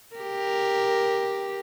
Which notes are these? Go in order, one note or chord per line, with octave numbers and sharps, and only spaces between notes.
G4 A#4